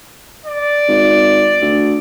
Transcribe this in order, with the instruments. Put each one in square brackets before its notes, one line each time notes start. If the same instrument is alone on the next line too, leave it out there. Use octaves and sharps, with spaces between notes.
[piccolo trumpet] D5
[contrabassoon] G#1
D2